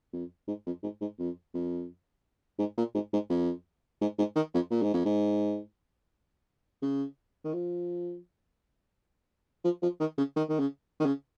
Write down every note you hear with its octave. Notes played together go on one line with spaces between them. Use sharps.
F2
G#2
F2
G#2
G#2
F2
F2
G#2
A#2
G#2
G#2
F2
G#2
G#2
D#3
F2
A#2
G#2
F2
G#2
C#3
D#3
F3
F3
F3
D#3
C#3
D#3
D#3
C#3
D#3
C#3